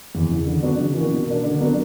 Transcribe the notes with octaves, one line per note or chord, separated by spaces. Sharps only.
E2
C#3 E3
D3
F#3 B3 D4 F#4
C#3
E3 A#3 C#4 F#4
B2
A#3 D4
D3
F#3 B3 D4 A#4